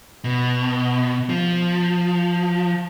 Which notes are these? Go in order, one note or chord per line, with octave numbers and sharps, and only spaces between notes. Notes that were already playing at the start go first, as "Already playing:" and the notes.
B2
F3